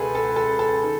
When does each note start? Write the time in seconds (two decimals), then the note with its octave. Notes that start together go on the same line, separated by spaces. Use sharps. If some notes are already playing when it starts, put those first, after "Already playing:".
Already playing: C#2 B2 G#4 A4 B4
0.15 A4
0.36 A4
0.59 A4
0.84 D#3